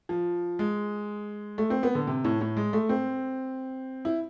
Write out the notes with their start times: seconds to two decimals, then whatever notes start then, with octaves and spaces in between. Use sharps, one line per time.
0.09 F3
0.59 G#3
1.58 A3
1.70 C4
1.83 B3
1.95 D3
2.07 C3
2.24 A2
2.41 A2
2.57 G#3
2.73 A3
2.89 C4
4.05 E4